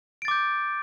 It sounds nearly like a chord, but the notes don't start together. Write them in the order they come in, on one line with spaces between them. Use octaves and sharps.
D7 A6 D6 G6